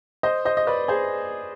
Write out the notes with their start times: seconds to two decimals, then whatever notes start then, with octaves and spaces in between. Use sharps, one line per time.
0.23 C5 D#5
0.45 C5 D#5
0.57 D#5
0.67 B4 D5
0.88 G#4 C5